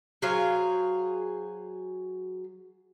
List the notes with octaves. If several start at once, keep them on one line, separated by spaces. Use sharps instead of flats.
F#3 G#4 C5 F5